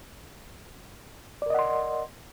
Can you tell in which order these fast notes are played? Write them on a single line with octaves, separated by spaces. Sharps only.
D5 A#4 D#5 F#5 C6